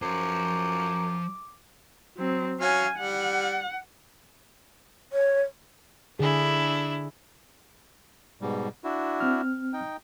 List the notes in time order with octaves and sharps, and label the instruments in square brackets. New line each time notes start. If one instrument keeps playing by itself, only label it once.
[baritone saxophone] F#2 [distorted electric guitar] F3 C5 [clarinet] D6
[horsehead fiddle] F#3 C4
[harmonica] F#3 C#4 [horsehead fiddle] F5 G#5
[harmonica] G3 [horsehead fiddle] F#5
[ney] C#5
[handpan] D3 G#4 [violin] D4 E4
[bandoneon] G#2 B2 G3
D4 E4 F#4
[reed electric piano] C4 F6
[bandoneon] D#4 G5